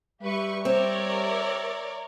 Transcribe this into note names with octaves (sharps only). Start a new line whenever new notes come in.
G3 G4 B4 E5 C#6
C4 A#4 C#5 D5